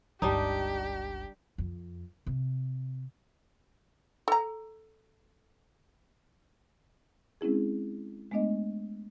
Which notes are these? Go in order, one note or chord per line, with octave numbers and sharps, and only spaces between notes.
G1 C#2 G3 D4 D#4 G4
F2
C3
A4 A#5
G#3 C4 C#4 E4 G#4
G#3 A3 B3 D4 D#5